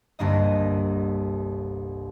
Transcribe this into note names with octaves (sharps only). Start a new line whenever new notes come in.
G1 C2 G2 A#3 D#5